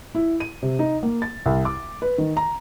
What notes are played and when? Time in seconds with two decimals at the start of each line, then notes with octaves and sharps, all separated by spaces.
0.15 E4
0.40 D#7
0.63 C3
0.79 D#4
1.03 A#3
1.22 A6
1.46 C2
1.65 D6
2.02 B4
2.18 D#3
2.37 A#5